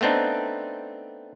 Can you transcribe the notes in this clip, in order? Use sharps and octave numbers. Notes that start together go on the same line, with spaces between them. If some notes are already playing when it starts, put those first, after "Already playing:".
A3 B3 C4 D4 D#4